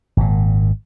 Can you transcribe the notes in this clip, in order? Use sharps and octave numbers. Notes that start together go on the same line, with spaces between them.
G#1 A#2